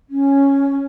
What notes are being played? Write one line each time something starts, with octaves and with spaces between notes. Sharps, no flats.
C#4